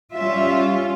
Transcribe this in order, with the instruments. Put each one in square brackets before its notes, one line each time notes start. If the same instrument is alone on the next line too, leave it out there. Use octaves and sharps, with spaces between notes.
[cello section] G3 C#4 F4 E5